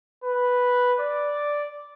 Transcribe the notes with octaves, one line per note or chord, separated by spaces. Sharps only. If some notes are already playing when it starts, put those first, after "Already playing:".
B4
D5